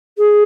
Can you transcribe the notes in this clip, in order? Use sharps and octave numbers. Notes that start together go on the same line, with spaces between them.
G#4